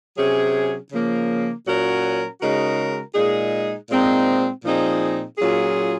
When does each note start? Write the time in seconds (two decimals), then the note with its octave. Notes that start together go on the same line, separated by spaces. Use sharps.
0.17 C3 F#3 C#4 G#4
0.91 C#3 F3 A#3
1.66 A#2 F#3 C#4 F#4 A#4
2.41 C#3 G#3 D#4 F#4 A#4
3.15 A#2 G#3 D#4 G#4
3.89 A#2 G#3 C4 D#4
4.64 A#2 F3 C4 D#4 G#4
5.38 A#2 F#3 C#4 F4 G#4